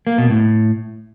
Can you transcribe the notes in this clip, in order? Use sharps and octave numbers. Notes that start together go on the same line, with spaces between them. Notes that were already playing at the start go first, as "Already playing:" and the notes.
A#3
B2
A2